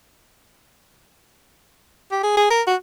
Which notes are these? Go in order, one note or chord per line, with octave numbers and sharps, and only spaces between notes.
G4
G#4
G#4
A#4
F#4